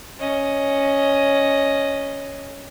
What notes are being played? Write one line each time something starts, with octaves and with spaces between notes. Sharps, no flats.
C#4 D#5